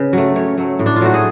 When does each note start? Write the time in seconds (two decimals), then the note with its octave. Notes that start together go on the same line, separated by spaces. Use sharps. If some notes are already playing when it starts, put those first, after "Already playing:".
Already playing: C#3 B4
0.13 F#3 A3
0.36 C#3 C#5
0.58 F#3 A3
0.79 A2
0.86 D4
0.96 F4
1.01 F#3 A3 F#4
1.14 G#4